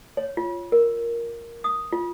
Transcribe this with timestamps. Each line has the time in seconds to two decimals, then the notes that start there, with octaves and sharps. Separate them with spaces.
0.17 C#5
0.37 F4
0.72 A#4
1.64 D#6
1.93 F4